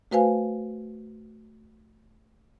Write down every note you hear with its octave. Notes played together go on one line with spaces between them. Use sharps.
A3 F#4 B4 C5 F5 G#5